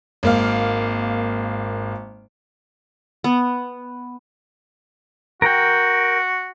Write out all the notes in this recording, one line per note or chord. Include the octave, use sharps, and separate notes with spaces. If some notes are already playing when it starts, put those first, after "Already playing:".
G#1 A#3 F5
B3
F#4 A#4 G5